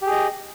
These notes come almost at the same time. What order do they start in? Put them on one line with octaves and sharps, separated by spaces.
G4 G#4 D#5